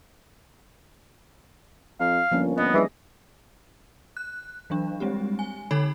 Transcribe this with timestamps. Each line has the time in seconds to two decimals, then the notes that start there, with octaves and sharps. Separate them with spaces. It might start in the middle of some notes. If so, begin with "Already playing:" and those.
2.00 F2 F5
2.31 G1 F3 A#3 C#4
2.58 G1 B3 D#5
2.74 G2 E3 G3 G#4 D#5
4.17 F#6
4.70 E3 F#3 D4
5.00 G3 G#3 C4 G4
5.39 G#5
5.71 D3 D#4 A4 C#5 B5